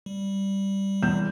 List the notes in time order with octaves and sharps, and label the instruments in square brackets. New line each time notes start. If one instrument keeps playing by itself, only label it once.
[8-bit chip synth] G3
[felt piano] E2 G6 E7